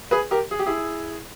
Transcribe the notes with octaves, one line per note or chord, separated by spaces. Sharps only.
G#4 B4
G4 A#4
G#4
G4
E4 G#4